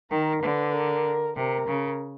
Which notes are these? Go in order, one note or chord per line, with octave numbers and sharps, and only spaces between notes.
D#3 A#4
D3 B4
A#4
C3 A#4
C#3